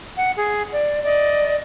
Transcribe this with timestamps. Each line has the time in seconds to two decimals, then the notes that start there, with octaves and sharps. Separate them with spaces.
0.17 F#5
0.37 G#4
0.72 D5
1.04 D5 D#5